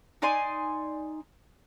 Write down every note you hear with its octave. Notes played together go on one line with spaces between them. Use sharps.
D#4 D5 G#5 C6